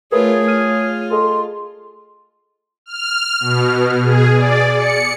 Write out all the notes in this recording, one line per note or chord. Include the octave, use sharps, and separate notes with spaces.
A3 F4 G#4 A#4 B4 C#5 E5
F4 F6 D#7
G#4 A4 D#5 C6
F6
B2
G#4
D5
C#7